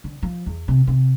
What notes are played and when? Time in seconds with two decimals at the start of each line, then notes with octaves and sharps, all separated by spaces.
0.04 D3
0.23 F3
0.46 E2
0.68 C3
0.87 C3